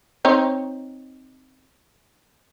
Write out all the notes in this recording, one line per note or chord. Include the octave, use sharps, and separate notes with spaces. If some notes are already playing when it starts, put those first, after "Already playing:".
C4 D#4 C#5